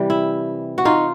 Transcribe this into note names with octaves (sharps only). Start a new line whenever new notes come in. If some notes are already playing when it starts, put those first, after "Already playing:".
Already playing: C3 E3 G3
E4
F#4
D#4 F4